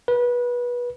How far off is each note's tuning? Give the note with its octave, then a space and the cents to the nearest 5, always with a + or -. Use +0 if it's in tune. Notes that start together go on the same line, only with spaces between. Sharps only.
B4 -25